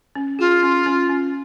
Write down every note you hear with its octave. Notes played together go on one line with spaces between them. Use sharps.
C#4
F4 G#4
C#4
C#4
C#4